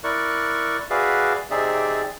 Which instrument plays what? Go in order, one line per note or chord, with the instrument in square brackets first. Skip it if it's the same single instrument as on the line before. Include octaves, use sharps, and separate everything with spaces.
[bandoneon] E4 A#4 D5 C#6 F#6
F#4 G#4 B4 D5 E5 F5
C3 C4 D#4 G#4 D5 E5